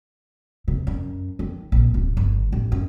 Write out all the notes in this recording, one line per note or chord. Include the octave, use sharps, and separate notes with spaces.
C3
F#2
D#3
A#1
D1
G1
A1
F#2